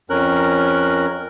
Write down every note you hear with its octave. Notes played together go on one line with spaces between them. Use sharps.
F2 C#4 A#4 F#6